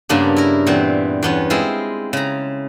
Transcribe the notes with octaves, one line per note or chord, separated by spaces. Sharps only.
G2 C#3 A#3 B3 D4
E4 A#4
A#2 E3 B3 C4
E2 B3 C#4
G#3 C4 E4 F4
C#3 A#5